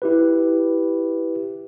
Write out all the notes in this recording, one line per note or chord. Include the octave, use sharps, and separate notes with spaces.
E4 G4 B4